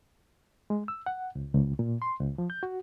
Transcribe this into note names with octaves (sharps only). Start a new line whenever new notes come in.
G#3
E6
F#5
C#2
C#2
A#2
C6
C#2
F3
G6
F#4